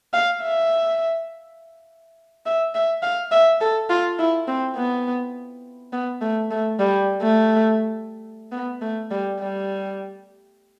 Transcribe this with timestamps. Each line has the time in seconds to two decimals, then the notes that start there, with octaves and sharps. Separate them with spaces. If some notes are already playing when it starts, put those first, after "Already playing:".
0.13 F5
0.43 E5
2.46 E5
2.75 E5
3.03 F5
3.32 E5
3.61 A4
3.90 F4
4.19 E4
4.48 C4
4.76 B3
5.93 B3
6.21 A3
6.51 A3
6.79 G3
7.22 A3
8.52 B3
8.81 A3
9.11 G3
9.39 G3